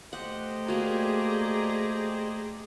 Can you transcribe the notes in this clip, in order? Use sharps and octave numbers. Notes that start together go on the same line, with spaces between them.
A3 G4 C5 D#5 F#5
A#3 F#4 G#4 D5 A#5